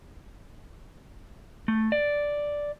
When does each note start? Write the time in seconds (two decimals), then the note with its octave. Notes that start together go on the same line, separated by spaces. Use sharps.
1.68 A3
1.92 D5